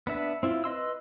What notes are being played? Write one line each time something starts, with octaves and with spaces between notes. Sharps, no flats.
B3 D4 E5
C4 E4 F4
B4 D#5 C6 E6